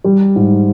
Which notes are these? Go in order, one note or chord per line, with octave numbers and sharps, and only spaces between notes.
G3
G#2